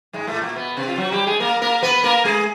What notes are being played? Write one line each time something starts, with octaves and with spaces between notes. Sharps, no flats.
G#2 G#3
A2 A3
A#2 A#3
B2 B3
C3 C4
F4
F#3 F#4
G3 G4
G#3 G#4
A#3 A#4
A#3 A#4
B3 B4
A#3 A#4
G#3 G#4